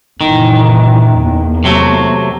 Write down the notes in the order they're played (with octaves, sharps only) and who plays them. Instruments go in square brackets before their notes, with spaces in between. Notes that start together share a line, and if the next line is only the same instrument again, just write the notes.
[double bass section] F#1 A#2 E3 [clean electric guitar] D#3
[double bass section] E2 A#3
[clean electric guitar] C3 F#3 A3